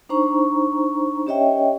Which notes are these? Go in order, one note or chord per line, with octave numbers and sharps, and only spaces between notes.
D4 D#4 C5 A#5 C#6
C#4 G4 C#5 D#5 E5 G5